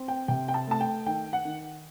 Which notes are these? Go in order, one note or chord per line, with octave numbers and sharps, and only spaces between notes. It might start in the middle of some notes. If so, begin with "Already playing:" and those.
Already playing: C4
G5
C3 G5
G5
A5
A3 A5
G5
D#3 G5
F#5
D#3